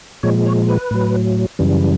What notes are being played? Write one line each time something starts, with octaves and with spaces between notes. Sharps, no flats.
A#2 F3 G#3 C#5
C#5
B4
A2 F#3
F#2 C#3 E3 G3